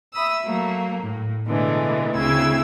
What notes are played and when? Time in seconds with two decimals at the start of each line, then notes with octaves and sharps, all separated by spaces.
0.13 E5 B5 D#6 E6
0.43 F#3 A3 A#3
1.03 A2
1.47 B2 D3 E3 G#3 A3 D4
2.15 D2 C#3 C4 E4 E6 G#6